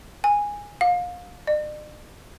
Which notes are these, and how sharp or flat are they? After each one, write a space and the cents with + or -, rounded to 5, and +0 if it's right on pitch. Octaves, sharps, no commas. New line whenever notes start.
G#5 -10
F5 +30
D5 +45